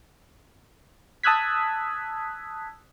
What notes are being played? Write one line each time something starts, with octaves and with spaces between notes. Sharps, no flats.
A5 D#6 E6 F#6 G#6 B6